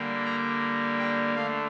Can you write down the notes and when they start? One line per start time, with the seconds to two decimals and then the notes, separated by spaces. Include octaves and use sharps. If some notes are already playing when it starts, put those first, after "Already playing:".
Already playing: D3 G3 A#3
0.25 A#5
0.99 G5
1.35 D3 A3 F5